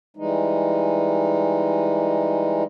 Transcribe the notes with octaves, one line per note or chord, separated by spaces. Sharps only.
E3 G3 G#3 D#4